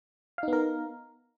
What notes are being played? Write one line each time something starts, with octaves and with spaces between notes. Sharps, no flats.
B3 D#4 A#4 F5